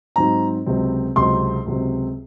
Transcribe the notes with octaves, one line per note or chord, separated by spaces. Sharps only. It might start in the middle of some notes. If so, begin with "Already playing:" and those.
G#2 F#3 C4 D#4 A#5
C#2 C3 F#3 C4
C#2 C3 F#3 C4 C6
C#2 C3 F#3 C4